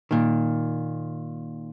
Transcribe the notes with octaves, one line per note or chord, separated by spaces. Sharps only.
A#2 D#3